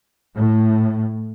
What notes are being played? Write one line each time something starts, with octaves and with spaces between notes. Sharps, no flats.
A2